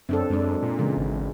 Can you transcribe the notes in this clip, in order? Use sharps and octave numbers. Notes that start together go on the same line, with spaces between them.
F#2 C4 D4 A4
F#2 G#3 D4
A#2
C#3 E3 G#3
G#1